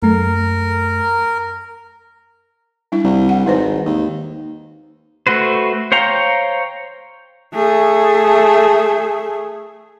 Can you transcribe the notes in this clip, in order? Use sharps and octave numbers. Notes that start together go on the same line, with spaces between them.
F#2 A3 A#4
G3 D4 E4
C2
F#5
G#1 D#4 B4 C5
D#2
A3 F#4 B4 C5
C5 C#5 F5 G5 A#5
A3 G#4